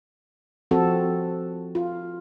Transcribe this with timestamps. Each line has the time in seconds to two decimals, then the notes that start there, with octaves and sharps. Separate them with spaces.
0.71 F3 C4 F#4 A4
1.75 F4